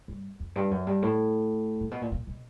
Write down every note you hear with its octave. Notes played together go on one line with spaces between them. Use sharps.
G2
F2
G2
F#2
G2
A2
A#2
B2
A#2
A#2
B2